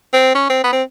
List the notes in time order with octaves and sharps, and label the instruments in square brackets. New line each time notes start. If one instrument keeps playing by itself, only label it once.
[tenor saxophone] C4
C#4
C4
B3
C4